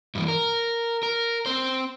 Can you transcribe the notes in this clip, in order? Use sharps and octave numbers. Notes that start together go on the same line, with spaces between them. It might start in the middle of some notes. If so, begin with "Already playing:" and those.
G2 E3
A#4
A#4
C4 C5